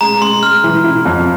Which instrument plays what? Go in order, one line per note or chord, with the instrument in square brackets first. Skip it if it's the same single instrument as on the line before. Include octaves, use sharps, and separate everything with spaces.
[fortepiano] G#3 [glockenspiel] A#5
[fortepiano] G#3 [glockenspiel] C6
[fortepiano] G#3 [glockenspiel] F6
[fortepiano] E3
E4
F2